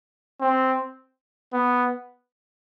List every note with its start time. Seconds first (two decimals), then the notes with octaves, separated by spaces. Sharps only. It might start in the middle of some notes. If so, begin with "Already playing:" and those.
0.41 C4
1.54 B3